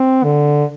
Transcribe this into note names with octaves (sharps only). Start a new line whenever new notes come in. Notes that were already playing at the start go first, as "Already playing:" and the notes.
Already playing: C4
D3